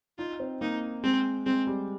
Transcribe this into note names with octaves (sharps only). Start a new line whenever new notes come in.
D#4 F4
C4
A#3 D#4
G#3 C4
G#3 C4
G3